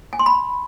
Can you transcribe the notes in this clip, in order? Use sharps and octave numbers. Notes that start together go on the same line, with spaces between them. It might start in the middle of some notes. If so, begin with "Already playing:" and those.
G#5
C6
B5